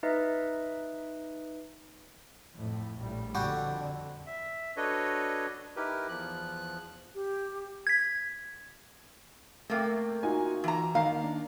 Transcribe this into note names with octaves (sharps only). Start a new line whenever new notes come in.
D#4 B4 D#5 E5
F2 A2
A#1 A2 G3
F2 D3 G3 F#4 G4
E5
D4 F#4 A4 B4 C#5 D#5
D#4 E4 G4 A#4 B4
E2 F3 F#6
G4
G#6 B6
C3 A3 A#3 G5
D#4 F4 F#4 G#5
E3 A#5
D#3 A#3 F5 A#5
D4